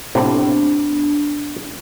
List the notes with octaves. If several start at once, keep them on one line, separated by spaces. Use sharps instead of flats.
A2 C3 B3 D4